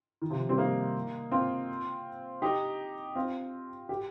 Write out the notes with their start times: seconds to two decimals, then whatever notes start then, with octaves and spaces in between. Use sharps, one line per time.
0.22 D#3
0.30 C3 F3
0.49 G3 C4
0.58 A#3 D#4
1.31 C4 F4
2.42 D#4 G4
3.15 C4 F4
3.89 G4